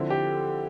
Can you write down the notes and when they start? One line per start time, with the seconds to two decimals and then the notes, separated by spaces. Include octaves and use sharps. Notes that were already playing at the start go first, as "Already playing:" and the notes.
Already playing: D3 F3 C4 E4
0.10 G4